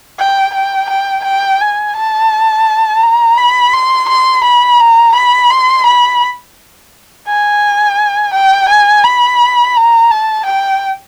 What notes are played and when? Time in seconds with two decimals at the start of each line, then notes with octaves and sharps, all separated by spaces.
0.19 G5
0.54 G5
0.90 G5
1.25 G5
1.61 G#5
1.96 A5
3.02 A#5
3.38 B5
3.73 C6
4.09 C6
4.44 B5
4.80 A#5
5.15 B5
5.50 C6
5.87 B5
7.28 G#5
8.34 G5
8.69 G#5
9.05 B5
9.76 A#5
10.11 A5
10.46 G5